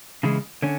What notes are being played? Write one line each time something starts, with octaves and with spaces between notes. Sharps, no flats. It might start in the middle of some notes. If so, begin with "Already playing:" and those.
C#3 E3 G#3
D3 C#4